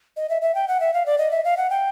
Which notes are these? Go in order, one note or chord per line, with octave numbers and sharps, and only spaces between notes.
D#5
E5
E5
G5
F#5
E5
F5
D5
D#5
E5
F5
F#5
G5